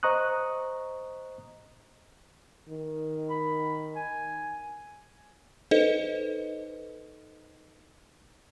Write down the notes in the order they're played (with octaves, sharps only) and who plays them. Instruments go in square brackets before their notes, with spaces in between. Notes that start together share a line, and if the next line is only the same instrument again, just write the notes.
[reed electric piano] C5 D#5 A#5 C#6 D#6 F#6
[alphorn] D#3
[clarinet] B5
G#5
[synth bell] D#4 A4 B4 C5 D#5